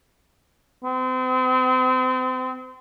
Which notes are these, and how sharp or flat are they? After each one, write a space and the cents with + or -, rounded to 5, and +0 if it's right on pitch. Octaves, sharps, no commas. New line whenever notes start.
C4 -35